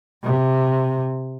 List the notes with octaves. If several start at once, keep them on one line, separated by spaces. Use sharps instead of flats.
C3